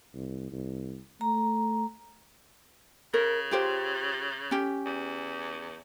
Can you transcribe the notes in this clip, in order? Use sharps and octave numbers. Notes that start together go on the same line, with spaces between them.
C2
C2
A3 A#5
C#3 A#4
F4 G4 C5
C#4 G4
E2